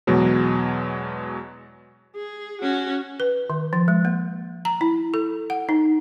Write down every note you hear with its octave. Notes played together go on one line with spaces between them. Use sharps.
E2 B2 F#3 G#3
G#4
C#4 F#4
B4
D#3
F3
G#3
A#3
A#5
E4
A4
F#5
D#4